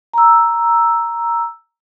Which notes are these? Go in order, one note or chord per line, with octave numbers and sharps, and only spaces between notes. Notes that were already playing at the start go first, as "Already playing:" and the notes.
A#5 E6